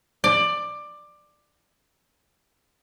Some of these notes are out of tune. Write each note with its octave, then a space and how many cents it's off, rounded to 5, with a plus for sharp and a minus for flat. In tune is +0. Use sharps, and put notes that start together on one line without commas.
D5 +15